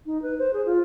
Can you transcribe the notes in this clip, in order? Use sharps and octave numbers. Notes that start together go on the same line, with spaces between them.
D#4
B4
C5
G#4
F4